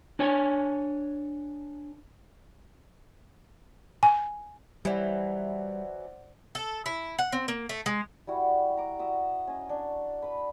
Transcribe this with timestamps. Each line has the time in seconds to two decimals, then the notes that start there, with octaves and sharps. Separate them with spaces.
0.19 D4 C#5 G#5
4.03 G#5
4.85 E3 F#3 G3 C5 D5 F#5
6.55 A4
6.86 E4
7.19 F#5
7.32 C4
7.48 A#3
7.69 A3
7.86 G#3
8.27 G3 E4 F#4 F#5
8.77 A#5 D6
8.99 F#4 E5 D#6
9.47 C#4 D#5
9.69 D4
10.22 B4 B5